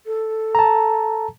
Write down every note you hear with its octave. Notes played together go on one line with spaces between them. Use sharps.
A4
A5 A#5